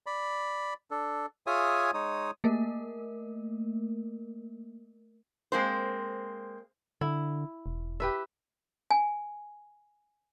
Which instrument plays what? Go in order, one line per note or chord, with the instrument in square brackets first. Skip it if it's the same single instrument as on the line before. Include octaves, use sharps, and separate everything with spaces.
[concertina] D5 B5
D4 A4
F4 G#4 C#5 E5 G#5 D#6
G#3 D#4 C#5 D#6
[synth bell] A3 A#3 A#4
[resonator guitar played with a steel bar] G#3 A#3 C4 C5
[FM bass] D3 [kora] E4
[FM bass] E1
[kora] G4 B4 E5
[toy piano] G#5